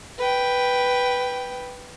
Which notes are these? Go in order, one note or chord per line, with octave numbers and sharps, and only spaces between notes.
B4 G5